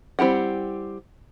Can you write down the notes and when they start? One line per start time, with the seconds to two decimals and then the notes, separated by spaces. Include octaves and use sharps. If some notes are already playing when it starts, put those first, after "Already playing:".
0.19 G3 C4 E4 G4 F#5